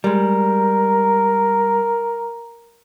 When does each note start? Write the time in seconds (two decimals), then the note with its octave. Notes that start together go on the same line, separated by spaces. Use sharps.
0.04 G3 G#3 A#4